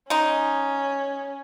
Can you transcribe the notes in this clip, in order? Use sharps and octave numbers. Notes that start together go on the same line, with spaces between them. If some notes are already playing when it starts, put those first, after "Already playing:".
G#3 C#4 D#4